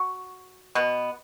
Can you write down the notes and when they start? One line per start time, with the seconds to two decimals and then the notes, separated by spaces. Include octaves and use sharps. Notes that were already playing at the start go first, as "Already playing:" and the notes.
Already playing: F#4
0.75 B2 B3